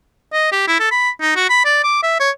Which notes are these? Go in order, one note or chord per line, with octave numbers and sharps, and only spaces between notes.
D#5
G4
E4
A4
B5
D#4
F#4
B5
D5
D6
E5
C#5